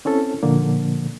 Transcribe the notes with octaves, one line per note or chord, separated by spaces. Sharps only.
C4 C#4 E4 A4
A#2 D3 F3 A#3